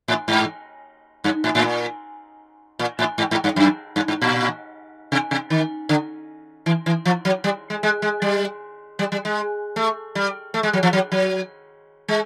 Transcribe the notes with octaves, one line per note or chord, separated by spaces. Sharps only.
A2
G#2
G2
A2
A2
A#2
A#2
A2
G#2
G#2
G2
F#2
G2
G#2
A#2
C3
C3
D#3
D3
E3
E3
F3
F#3
G3
G#3
G#3
G#3
G3
G3
G3
G#3
A3
G3
A3
G#3
F#3
F3
F#3
F#3
G#3